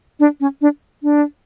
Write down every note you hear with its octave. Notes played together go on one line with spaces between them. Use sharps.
D4
C#4
D4
D4